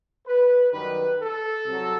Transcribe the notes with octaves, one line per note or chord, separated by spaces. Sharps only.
B4
F#2 D#3 G3 B4
A4
C2 C3 F#3